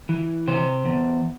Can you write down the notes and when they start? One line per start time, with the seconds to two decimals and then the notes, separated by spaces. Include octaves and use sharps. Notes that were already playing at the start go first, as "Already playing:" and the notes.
0.09 E3
0.47 C3 C5
0.86 E2